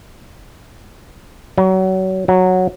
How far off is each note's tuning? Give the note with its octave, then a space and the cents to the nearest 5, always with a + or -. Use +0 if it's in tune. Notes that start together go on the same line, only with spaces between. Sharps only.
F#3 +30
F#3 -5